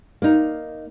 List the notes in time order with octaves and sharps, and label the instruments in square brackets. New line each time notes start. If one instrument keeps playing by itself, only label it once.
[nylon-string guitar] A#3 D#4